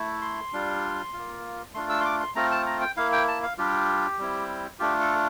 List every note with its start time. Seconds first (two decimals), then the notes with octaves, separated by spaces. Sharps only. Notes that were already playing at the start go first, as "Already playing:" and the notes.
Already playing: A3 E4
0.22 C6
0.53 G3 D4 F4
1.13 A#3 F4
1.74 A3 D4 F4 C6
1.89 E6
2.00 C6
2.05 D6
2.20 C6
2.35 A3 C4 F4 A#5
2.51 A5
2.66 A#5
2.81 G5
2.97 A#3 E4 F5
3.12 G5
3.28 A5
3.43 F5
3.58 G3 D4 F4 G4
4.18 G3 C4 E4
4.79 A3 D4 F4 G4
5.00 A4